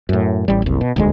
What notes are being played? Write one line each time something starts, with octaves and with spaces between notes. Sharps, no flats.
F#2 A2
A1 G3
F#1 C2
B2
D#1 D2 G#3